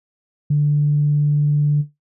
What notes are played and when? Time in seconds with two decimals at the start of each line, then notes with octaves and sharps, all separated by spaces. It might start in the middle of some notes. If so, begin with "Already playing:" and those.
0.50 D3